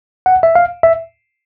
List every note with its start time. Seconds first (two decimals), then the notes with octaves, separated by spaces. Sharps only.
0.26 F#5
0.43 E5
0.55 F5
0.83 E5